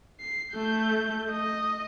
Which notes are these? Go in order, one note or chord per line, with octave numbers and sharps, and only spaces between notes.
C7
A3 G6
D#5